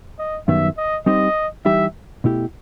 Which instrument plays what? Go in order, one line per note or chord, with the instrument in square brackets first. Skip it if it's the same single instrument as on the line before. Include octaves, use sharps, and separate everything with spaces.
[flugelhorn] D#5
[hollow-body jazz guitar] F#2 D#3 G3 B3 [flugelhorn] E5
[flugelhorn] D#5
[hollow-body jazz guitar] G3 C4 D#4 G4 C5 [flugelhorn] D#5
[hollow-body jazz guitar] E3 G3 D#4 G4 [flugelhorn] E5
[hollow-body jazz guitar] B2 A3 E4 G4